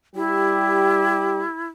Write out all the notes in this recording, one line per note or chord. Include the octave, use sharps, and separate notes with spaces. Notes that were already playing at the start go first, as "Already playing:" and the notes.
G3 E4 G4